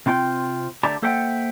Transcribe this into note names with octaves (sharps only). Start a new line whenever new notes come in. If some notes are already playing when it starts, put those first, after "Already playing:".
C3 C4 F4 G5
D3 A3 G4 D5 A5 A#5
A#3 A4 C5 E5 F#5 G5